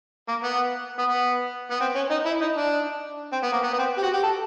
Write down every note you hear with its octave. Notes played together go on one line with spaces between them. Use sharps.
A#3
B3
B3
B3
B3
C4
C#4
D#4
E4
D#4
D4
C4
B3
A#3
B3
B3
C4
G4
F#4
G4
A4